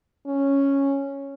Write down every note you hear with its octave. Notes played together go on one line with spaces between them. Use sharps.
C#4